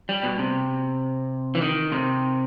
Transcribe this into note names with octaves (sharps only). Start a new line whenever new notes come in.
G3
B2
C3
E3
D#3
C3